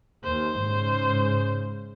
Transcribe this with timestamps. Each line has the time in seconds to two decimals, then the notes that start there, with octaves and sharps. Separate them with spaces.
0.24 D#2 C5
0.60 G#2 C#3